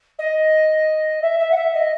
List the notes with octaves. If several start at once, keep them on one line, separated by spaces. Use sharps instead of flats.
D#5
E5
E5
F#5
E5
D#5